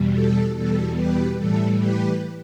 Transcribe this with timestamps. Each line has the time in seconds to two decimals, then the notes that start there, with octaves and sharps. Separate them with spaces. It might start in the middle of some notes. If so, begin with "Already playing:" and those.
Already playing: E2 B2 G3
0.14 A4
0.55 E2 B2 G3 A4
0.96 G4 B4
1.37 A2 E3 G3 A4
1.79 G4 B4